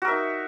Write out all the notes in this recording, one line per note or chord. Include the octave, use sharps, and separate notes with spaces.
D#4 F#4 A#4 E5